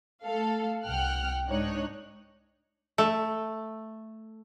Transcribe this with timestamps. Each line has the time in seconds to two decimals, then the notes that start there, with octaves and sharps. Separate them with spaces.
0.24 A3 A4 F5
0.84 C2 F#5 G5 F6 F#6
1.48 G#2 D4 D#4 C#5 F#6
2.98 A3